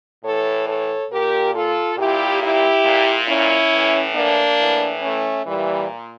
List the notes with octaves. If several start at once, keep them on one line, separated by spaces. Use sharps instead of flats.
A2 E3 A4 C#5
A4 C#5
A#2 G4 A#4
F4 A4
A#2 E4 G4
E4 G4
A#2
C#4 E4
A2 E3
A#3 D4
A2 E3
A3 C#4
A#2 E3 G3